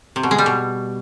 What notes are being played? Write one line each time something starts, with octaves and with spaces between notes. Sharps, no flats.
C3
B2
G#3
G3
B2